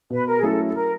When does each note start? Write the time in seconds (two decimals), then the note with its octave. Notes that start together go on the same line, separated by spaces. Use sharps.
0.10 B2 B4
0.27 A#4
0.36 G#4
0.43 F#3 A3 C#4 E4 A4
0.66 A4
0.74 A#4